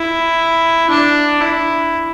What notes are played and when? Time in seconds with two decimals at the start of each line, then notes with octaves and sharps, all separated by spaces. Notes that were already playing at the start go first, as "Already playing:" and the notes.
Already playing: E4
0.90 D4
1.41 E4